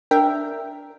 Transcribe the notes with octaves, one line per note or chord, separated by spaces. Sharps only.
D4 A#4 E5 G5